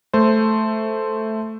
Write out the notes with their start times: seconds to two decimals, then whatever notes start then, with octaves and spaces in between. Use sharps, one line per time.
0.14 A3 C5